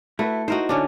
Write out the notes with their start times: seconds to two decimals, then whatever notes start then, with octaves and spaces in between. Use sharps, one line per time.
0.19 A3 E4 F#4 B4
0.48 D#4 E4 F#4 A#4 C5 D#5
0.69 D3 C#4 D4